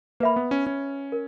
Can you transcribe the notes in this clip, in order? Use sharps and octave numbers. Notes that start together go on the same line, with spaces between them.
A#3 B4 E5 B5
B3
C#4
C#4
A#4